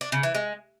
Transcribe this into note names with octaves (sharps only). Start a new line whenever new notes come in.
D4
C#3
E3
G#3